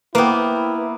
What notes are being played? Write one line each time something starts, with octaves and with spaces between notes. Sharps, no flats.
A#3 B3 E4 B4 G5